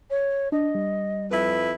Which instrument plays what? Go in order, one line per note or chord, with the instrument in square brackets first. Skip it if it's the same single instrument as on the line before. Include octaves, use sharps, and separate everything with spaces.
[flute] C#5
[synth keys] D4 [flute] D#5
[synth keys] G3
[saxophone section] F2 E4 B4